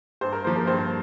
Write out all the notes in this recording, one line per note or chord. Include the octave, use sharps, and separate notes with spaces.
G2 C5
A#4
F3 A#3 C5
A#4
G2 C5